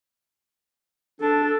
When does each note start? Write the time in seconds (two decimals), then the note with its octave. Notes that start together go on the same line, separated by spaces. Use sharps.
1.21 D4 A4